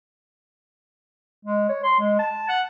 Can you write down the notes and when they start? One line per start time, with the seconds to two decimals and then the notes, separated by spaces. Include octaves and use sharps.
1.45 G#3
1.69 C#5
1.83 C6
1.99 G#3
2.19 A5
2.49 F#5